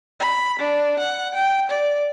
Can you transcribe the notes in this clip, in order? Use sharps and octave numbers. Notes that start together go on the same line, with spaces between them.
B5
D4
F#5
G5
D5